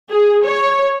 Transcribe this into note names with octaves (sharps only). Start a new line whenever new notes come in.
G#4
C#5